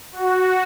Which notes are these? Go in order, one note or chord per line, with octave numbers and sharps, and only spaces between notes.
F#4